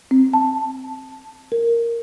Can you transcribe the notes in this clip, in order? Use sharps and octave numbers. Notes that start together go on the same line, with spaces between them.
C4
A5
A#4